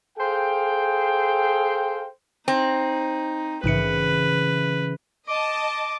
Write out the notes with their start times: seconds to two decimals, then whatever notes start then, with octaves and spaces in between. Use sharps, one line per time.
0.18 G#4 A4 C5 F5 G5
2.48 C4 D#4
3.64 A#1 G#2 C#3 E3 B4 C#7
5.27 D#5 A5 D6